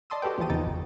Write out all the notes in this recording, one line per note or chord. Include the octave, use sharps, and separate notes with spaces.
D5 D#5 A5 C6 D#6 E6
F#4 G4 A4 B4 G5
D#2 A#2 E3 F3 A5 D#6
E2 C#3 D#4 G5 A6
G#1